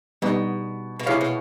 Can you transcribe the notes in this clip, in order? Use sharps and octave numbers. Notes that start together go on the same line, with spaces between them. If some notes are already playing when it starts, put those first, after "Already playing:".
B2 G3 B3 D#4
B2
C3 E4 G#4 C#5 F5
B2